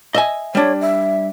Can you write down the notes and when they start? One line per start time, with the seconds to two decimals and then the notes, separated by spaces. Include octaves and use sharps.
0.14 D#5 E5 G#5
0.55 G3 D4 C#5
0.81 E5